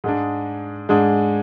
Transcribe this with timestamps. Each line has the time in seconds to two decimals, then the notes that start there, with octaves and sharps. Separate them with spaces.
0.04 G#2 G#3 D4
0.89 G#2 G#3 D4